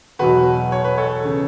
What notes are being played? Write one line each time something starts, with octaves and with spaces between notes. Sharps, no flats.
E2 B2 F#3 F#4 B4
C#5
B4
A4 C#5
C#3 E3